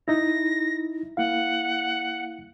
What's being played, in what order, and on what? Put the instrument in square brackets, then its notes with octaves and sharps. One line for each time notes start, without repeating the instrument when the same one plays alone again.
[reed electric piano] D#4 E4 [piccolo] A#6
[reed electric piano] A#3 E4 F5 [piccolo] F#5